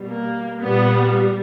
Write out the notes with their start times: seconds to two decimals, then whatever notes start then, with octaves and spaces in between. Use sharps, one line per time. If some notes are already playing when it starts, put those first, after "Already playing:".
Already playing: B2 G3
0.08 A#3
0.61 A#2 G3 B3